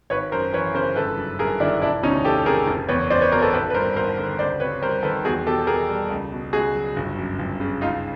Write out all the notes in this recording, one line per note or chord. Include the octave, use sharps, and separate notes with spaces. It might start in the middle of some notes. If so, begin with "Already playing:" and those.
G#1 B4 C#5
F#2 A#4 C5
E3 B4 C#5
C#3 A#4 C5
G1 A4 B4
F#2
G1 G#4 A#4
D#3 D4 E4
E1 D4 E4
D2 C#4 D#4
F3 G4 A4
C3 G#4 A#4
F#1
E2 B4 C#5
F#1 C5 D5
B4 C#5
B2 A#4 C5
A4 B4
G#1 A4 B4
B4
G2 A#4 C5
G#1 A#4 C5
D3
C#2 C5 D5
C3 B4 C#5
G3 A#4 C5
D#3 A4 B4
E2 F#4 G#4
B2 G4 A4
E2 G#4 A#4
G3
C#2
B2
C#2 F#4 G#4
F#3
G1
F#2
G1
C#3
C#2 D#4 F4